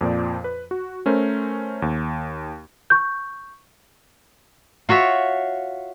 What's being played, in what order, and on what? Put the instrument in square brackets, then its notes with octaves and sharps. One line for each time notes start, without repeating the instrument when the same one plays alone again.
[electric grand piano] F2 A#2 F3 D5
B4
F#4
A3 C#4 A#4 C5
D#2
[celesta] C#6 G6
[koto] F4 F#4 C#5 E5